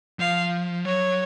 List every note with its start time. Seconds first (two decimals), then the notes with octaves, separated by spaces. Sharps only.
0.19 F3 F5
0.85 F#3 C#5